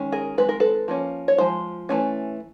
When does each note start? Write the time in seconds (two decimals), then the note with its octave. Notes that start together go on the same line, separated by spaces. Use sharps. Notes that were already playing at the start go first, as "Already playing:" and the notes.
Already playing: D#3 G#3 C#4
0.12 G#4 A#4
0.38 D#3 G#3 C4 B4
0.49 A#4
0.60 A4 B4
0.88 F3 A#3 C#4
1.28 C#5
1.38 F3 G#3 C5
1.89 E3 A3 C#4